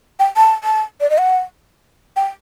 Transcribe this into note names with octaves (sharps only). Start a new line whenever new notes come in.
G5
A5
A5
D5
D#5
F#5
G5